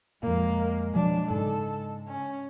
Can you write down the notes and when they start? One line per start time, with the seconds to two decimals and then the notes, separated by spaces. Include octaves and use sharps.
0.23 F2 A#2 G#3 A#3
0.95 B2 F3 F#3 D4
1.30 G#2 C#3 A4
2.08 C#4